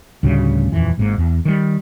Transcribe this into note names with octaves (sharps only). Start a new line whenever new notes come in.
D2 A2 C#3 G3
D#1 F2 E3
G#1 G#2 A#3
E2
D#3 G3